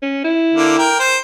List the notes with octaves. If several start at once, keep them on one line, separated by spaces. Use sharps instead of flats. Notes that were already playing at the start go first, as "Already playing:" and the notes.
C#4
E4
D3 A#3
A#4 G5
C5